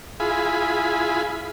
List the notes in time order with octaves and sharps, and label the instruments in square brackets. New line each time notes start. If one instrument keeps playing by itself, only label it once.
[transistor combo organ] E4 F4 G#4 B5